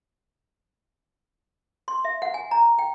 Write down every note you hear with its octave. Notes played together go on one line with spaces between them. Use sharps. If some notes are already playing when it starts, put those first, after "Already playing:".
C6
E5
F#5
G#5
A#5
G5